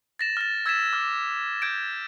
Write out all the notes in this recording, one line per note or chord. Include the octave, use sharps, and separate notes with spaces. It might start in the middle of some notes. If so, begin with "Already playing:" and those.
A6 A#6 E7
F6 A6
E6 G#6 A6 B6 E7
D6 F6
G6 G#6 D7